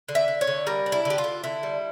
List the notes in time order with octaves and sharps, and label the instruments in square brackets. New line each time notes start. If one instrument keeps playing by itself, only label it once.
[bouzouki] D3
E5
D3
C#5
D3
G3 A#4
D4
E4
D3 G4
F4
D3
D3 E4
G3